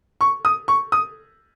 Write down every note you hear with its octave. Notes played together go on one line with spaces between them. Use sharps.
C#6
D#6
C#6
D#6